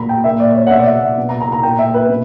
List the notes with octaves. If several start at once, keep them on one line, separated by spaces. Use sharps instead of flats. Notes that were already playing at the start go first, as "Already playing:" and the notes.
Already playing: A#2 A#5 B5
G5
A#2 E5
D5
C#5
F#5
B2 E5
D5
E5
F#5
B2
A#5
A#5
A#5
A#2 G5
E5
B4
B2